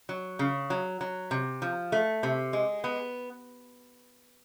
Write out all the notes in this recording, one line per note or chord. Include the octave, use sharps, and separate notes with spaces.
F#3
C#3
F#3
F#3
C3
F3
A3
C3
G#3
B3